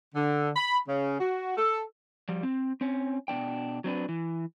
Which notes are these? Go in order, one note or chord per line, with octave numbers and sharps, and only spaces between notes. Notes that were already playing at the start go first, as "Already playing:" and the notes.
D3
B5
C#3
F#4
A4
F3 G3
C4
C4 C#4
B2 B3 D4 G5
F#3 C4 D4 B4
E3